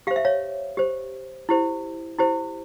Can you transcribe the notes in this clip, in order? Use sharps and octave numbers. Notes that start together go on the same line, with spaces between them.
G4 C5 F5
E5
C#5 F5
G4 C5
E4 G4 C5
E4 G4 C5